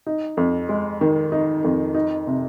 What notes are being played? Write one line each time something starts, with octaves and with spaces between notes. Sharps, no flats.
D#4
F2
G#3
D#3
D#4
F2
D#4
C3